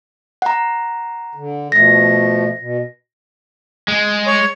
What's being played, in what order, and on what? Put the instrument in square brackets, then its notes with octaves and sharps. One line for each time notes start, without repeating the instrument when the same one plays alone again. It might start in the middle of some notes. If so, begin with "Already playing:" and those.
[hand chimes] F#5 A#5
[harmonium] D3
[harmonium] B2 F3 A3 [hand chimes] A#6
[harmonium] B2
[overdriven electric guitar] G#3
[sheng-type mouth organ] C#5